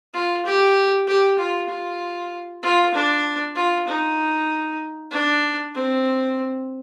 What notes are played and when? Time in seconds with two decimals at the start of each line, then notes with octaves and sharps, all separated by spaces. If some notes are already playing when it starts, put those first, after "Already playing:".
0.14 F4
0.46 G4
1.07 G4
1.39 F4
1.69 F4
2.63 F4
2.94 D4
3.56 F4
3.87 D#4
5.11 D4
5.74 C4